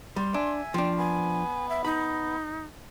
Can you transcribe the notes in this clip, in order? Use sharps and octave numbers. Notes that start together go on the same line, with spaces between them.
G3 C6
D4 E5 G#5
F3 D4 G5
B3 G#5
E5
D#4 B5